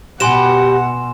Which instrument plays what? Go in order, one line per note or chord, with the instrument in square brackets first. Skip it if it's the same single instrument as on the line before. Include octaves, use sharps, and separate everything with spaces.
[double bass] B2 [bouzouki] F#4 G4 B4 [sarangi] F#5 [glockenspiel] G#5 C6 E7